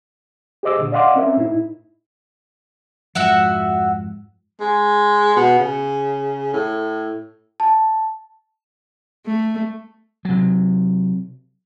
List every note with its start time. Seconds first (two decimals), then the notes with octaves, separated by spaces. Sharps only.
0.63 G4 G#4 C5 D#5 D6 E6
0.79 A#2 D3
0.92 D5 D#5 F5 F#5 C6 D6
1.15 C4 C#4 A#4 E5
1.37 A2 D#4 E4
3.15 F2 G#2 F3 F#4 E5 F#5
4.60 G#3
5.36 B2
5.59 C#3
6.53 A2
7.60 A5
9.26 A3
10.25 C3 F#3